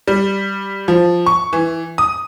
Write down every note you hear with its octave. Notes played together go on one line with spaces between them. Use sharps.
G3
F3
C#6
E3
D#6